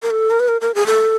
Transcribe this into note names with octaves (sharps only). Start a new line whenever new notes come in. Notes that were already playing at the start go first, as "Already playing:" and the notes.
A#4
A4
A#4
B4
A#4
A#4
G#4
A4